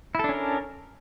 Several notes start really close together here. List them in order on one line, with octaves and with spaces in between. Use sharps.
E4 A4 D4 C#4 A#4